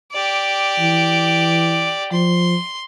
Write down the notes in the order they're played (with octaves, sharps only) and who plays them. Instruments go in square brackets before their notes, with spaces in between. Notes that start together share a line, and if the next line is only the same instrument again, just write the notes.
[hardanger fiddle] G4 D5
[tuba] E3
[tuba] F3 [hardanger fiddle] C6